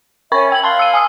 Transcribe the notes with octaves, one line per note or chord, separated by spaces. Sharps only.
C#4 A#4 E5 B5 C#6
G5 G#6 F#7
F5 A5 C6 G7
E6 D#7
G#5 D#6 E6